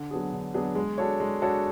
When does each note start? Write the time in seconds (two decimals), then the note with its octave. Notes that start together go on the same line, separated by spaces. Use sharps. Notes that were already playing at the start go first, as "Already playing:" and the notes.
Already playing: D3
0.11 F#3 B3 D4 G#4
0.32 D3
0.54 F#3 B3 D4 G#4
0.75 G#3
0.98 D4 F#4 A4 C#5
1.20 G#3
1.42 D4 F#4 A4 C#5